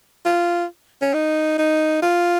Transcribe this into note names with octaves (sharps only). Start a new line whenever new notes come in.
F4
C#4
D#4
D#4
F4